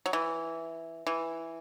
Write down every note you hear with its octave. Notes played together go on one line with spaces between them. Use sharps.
F#3
E3
E3